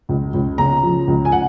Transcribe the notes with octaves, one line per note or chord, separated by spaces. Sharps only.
C#2
C#2
C#3 A#5
F3
C#2
G#5
F#5